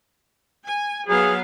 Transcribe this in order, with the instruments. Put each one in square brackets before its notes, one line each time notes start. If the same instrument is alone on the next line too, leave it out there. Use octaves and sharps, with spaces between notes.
[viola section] G#5
[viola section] F#3 B3 F5 [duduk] G#4